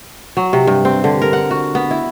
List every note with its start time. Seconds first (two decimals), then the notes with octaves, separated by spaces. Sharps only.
0.37 F#3
0.53 C3
0.67 G2
0.85 C4
1.04 D3
1.22 A#4
1.33 F#5
1.51 F#4
1.75 B3
1.91 E4